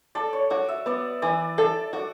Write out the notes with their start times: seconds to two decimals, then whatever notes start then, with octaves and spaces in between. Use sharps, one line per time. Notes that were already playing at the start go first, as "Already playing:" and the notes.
0.15 A4 D5
0.33 C#5
0.50 F#4 D5
0.68 E5
0.86 B3 D5
1.22 E3 D5
1.58 A4 D5
1.93 F#4 D5